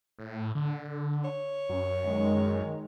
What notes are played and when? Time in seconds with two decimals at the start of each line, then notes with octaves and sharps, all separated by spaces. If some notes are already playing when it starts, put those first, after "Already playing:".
0.19 A2
0.55 D3
1.25 C#5
1.69 F#2
2.04 D#3 G#3